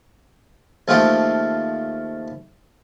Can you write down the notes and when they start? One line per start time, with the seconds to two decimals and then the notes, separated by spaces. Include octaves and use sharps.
0.88 D#2 F3 A3 F4 G5 D#6